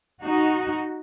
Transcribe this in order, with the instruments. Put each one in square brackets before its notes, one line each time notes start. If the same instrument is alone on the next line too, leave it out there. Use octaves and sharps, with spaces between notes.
[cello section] D#4 F#4